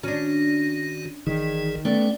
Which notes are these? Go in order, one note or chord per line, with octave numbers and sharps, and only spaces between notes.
D#3 C#4 D4 F#4
G1 D#3 E3 G#4
A3 B3 C#4 D5 G5